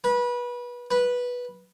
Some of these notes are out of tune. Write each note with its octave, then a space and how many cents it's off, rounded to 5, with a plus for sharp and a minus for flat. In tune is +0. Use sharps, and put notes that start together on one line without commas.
B4 -25
B4 -10